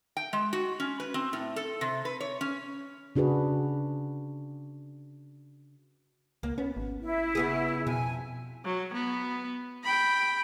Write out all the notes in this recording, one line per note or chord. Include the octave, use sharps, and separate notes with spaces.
G5
G#3
F#4
C#4
B4
C4
A2
A4
C3
B4
C#5
C#4
C#3 D4 F#4 G#4 B4
C#2 A#3
B3 C#4
G#1
E4
C#3 B3 G#4
F2 B2 G#5
F#3
B3
G5 B5